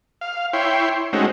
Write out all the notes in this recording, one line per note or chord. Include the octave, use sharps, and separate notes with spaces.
F5
E4 C#5 G5 C6
G#3 A3 C4 C#4 D#4 F#4